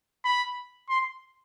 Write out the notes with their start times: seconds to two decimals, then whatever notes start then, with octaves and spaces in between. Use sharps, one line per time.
0.24 B5
0.89 C6